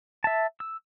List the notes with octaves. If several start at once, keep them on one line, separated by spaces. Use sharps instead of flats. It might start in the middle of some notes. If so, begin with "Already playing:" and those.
E5 A5
E6